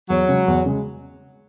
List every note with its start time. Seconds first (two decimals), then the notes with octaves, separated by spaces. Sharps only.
0.10 E2 F#3
0.29 C#3 G#3
0.48 E2
0.66 C#3 G#3